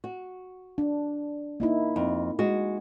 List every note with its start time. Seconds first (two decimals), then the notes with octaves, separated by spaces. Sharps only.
0.04 F#4
0.78 D4
1.60 A#3 D#4 E4
1.96 F2
2.39 G#3 F#4